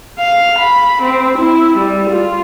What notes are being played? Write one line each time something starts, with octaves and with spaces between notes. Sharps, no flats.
F5
B5
C4
E4
G3
F4